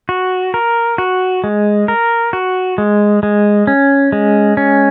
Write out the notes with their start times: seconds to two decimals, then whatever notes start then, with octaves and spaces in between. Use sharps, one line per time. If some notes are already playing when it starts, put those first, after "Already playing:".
0.09 F#4
0.54 A#4
0.98 F#4
1.44 G#3
1.88 A#4
2.33 F#4
2.78 G#3
3.23 G#3
3.67 C#4
4.12 G#3
4.57 C#4